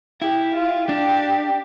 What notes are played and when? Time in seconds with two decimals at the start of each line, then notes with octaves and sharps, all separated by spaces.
0.22 E4 G4
0.55 F4
0.88 D4 G4